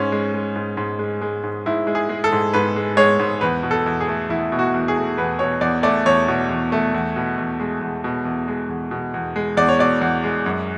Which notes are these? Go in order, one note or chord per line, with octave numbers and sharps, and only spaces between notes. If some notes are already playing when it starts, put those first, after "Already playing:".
Already playing: G#2 C#4
G#3
G#3
G#2
G#2
G#3
G#3
G#2
G#2 E4
G#3
G#4
G#3
A4
G#2
G#2 B4
G#3
G#3 C#5
G#2
E2 B4
B2
A4
E2
G#4
A3
E2 E4
B2
F#4
E2
G#4
A3
E2 B4
B2 C#5
E2 D5
A3 D5
E2 C#5
B2
E2
A3
E2
B2
E2
G#3
E2
B2
E2
G#3
E2
B2
E2
G#3
E2 D5
C#5
B2 D5
E2
G#3
F#2